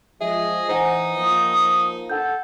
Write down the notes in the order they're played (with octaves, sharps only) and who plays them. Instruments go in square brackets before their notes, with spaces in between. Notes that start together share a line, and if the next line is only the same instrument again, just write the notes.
[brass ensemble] F3 G#3 [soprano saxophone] G#4 [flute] D#5 [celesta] E5
[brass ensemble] E3 [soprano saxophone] D#4 [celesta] C5 F#5 G#5
[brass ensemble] F3 A#3 [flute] D#6
[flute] A4 [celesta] F#5 G6